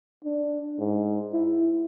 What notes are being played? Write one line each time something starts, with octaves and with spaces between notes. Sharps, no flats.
D4
G#2
E4